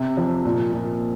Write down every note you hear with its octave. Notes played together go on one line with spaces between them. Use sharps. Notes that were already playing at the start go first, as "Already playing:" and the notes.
Already playing: C3
F2
A#2
A#2